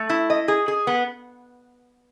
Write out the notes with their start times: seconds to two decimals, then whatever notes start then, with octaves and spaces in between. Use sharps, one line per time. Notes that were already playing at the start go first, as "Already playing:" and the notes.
Already playing: A3
0.10 E4
0.30 D#5
0.48 G#4
0.68 G#4
0.87 B3